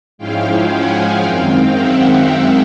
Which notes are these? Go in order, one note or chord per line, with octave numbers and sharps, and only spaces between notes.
G#2 F3 G#3 C#4 E4 F5 G5
F#5 G#5
F#2 D#3 G#3 C4 F5 G5
E5 F#5